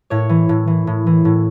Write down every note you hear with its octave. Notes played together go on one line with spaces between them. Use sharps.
A2 C#5
E3
A2
E3
A2
E3
A2